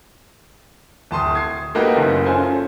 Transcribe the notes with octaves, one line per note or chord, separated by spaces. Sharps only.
D1 A5 C6 D#6
G#6 C7
A3 A#3 D#4 F#4 G4 B4
F#1 F#2
C#4 F4 A4 C5 G#5